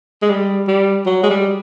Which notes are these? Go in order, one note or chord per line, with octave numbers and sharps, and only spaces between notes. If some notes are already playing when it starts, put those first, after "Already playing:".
G#3
G3
G3
F#3
G#3
G3